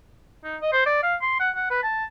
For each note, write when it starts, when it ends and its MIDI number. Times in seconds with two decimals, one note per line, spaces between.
0.44 0.56 63
0.61 0.71 75
0.73 0.83 72
0.86 1.02 74
1.03 1.15 77
1.21 1.40 84
1.40 1.50 78
1.56 1.68 78
1.71 1.80 71
1.83 2.04 81